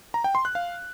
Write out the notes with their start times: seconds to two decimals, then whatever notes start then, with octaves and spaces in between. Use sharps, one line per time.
0.14 A#5
0.24 G5
0.35 C6
0.45 F#6
0.55 F5